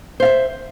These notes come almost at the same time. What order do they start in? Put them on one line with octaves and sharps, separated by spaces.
C5 F5 E5